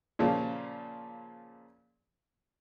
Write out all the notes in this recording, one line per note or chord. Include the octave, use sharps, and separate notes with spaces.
A#2 C#3 F3